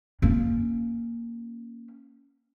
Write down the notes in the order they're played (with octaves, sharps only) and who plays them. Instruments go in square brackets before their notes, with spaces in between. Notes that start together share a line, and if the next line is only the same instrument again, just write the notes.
[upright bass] A#3 C#4